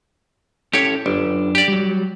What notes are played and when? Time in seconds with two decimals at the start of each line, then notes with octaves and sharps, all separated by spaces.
0.73 C#4 E4 G4 A4 C#5
1.06 G1 F#2 D4
1.55 G4 D5
1.68 F#3 G3